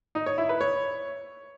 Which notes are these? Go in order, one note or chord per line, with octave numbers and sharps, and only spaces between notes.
D#4
C#5
E4
B4
C#5